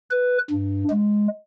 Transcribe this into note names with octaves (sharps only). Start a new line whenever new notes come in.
B4
G2
G#3